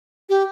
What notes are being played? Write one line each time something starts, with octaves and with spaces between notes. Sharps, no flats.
G4